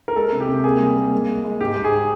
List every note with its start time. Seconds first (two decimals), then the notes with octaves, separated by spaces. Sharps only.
0.08 A#4
0.16 G#3 A4
0.32 C3
0.40 G4
0.49 C3
0.64 A#3 G#4
0.80 G3
0.97 A#3
1.13 G#3
1.29 G#3
1.45 G#3
1.61 G#2 G4
1.77 G#2
1.84 G#4